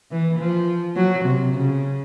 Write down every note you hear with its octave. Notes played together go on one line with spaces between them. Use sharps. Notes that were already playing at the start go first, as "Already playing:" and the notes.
E3
F3
F#3
C3
C#3